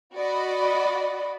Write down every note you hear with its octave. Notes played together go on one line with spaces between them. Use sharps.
F#4 D5 D#5 B5